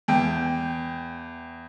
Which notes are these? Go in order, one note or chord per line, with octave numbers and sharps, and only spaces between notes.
E2 G5